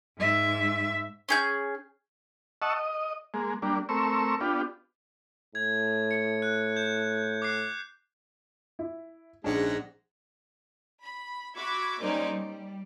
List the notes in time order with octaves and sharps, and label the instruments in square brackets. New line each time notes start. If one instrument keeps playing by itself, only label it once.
[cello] G#2 E5
[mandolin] C#4 G#4 G6
[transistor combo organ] D#5 F#5 A5 C#6 E6
D#5
G#3 A#3
G3 A#3 D4
A3 C4 A#4 C#6 E6
B3 D4 F4 G4
[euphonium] A2 [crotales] G#6
[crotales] C#7
F#6
G6
D6 F#6 C7
[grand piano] E4
[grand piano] A#1 C#4 [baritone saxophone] G#2 [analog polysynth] D4 F#5 A#6
[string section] B5
F#4 E5 B5 D6 G#6
G3 A#3 C#4 D#4 C5 D5
G3